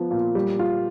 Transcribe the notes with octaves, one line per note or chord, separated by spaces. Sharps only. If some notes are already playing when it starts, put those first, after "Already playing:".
Already playing: F3 B3
A#2
G3
F4